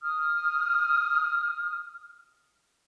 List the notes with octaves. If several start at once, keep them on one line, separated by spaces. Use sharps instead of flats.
D#6 F6